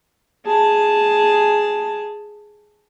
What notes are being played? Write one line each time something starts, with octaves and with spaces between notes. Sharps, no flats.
G#4 A5